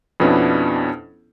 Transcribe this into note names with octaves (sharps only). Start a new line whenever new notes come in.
F2 B2 B3 C#4 D4 E4